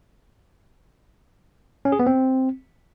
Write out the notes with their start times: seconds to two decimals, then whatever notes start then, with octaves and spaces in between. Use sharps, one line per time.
1.85 C#4
1.92 G#4
1.99 B3
2.07 C4